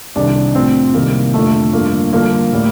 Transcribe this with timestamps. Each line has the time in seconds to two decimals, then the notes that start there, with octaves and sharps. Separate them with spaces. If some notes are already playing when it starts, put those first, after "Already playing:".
0.16 C2 C3 D#3 D4
0.55 A2 F3 C4
0.94 C2 C3 D#3 G3 A#3
1.34 F2 D3 F3 A3
1.73 G2 D3 F3 A#3
2.13 G2 D3 F3 A#3
2.52 A2 G3